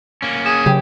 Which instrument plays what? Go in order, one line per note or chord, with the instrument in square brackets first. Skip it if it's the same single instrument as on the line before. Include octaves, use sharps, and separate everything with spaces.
[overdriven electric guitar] A#3 C#4
[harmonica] G#4 [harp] E7
[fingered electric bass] C#3 F#3 [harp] G4